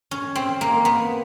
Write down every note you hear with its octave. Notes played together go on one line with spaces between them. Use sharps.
C#4
C4
A#3
B3